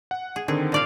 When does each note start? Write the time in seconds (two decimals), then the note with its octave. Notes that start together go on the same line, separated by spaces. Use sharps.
0.11 F#5
0.36 G#4
0.48 D3 D#3 C4 G#4
0.72 A#2 D5 F5